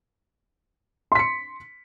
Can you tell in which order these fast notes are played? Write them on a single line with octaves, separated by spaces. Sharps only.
C6 B6 C#7